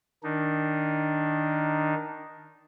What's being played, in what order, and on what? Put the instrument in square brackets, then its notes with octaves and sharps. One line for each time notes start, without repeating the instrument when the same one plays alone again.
[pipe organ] D#3 D4 D#4